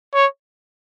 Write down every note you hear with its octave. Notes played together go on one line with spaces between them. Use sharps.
C#5